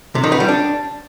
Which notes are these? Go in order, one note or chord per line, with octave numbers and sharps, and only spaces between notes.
C3
D#3
B3
G3
D4